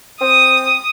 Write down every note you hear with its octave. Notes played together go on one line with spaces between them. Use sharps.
C4 D#6